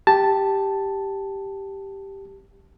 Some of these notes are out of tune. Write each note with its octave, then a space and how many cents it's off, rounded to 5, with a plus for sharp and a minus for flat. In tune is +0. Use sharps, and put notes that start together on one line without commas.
G4 +0 A5 +0